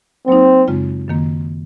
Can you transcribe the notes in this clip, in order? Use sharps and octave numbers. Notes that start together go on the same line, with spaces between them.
F#3 A#3 C4 D#4
F#2 C#3 G#3 C4 F4
F#2 D#3 A#3